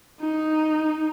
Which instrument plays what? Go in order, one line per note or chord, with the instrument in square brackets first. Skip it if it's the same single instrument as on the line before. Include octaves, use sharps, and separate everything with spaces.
[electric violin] D#4